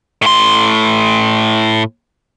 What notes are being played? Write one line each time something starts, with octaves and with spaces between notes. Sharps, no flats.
A2 C6